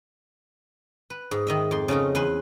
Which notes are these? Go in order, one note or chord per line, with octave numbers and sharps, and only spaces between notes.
B4
G#2
D#3 D#5 E5
F2 C6
C#3 A3 D#4 A#4
E2 B4 G#5 C6